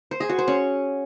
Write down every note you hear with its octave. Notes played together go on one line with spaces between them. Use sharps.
C5
G#4
F#4
C5
C#4